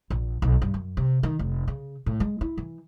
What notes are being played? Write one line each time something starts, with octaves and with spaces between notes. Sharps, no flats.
A#1
B1
G2
F#2
C3
D#3
F1
C#3
A2
G#3
E4
E3